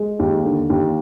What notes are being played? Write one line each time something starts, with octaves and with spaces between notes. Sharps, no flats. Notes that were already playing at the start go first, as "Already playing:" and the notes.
Already playing: G#3
D#2
D3
D#2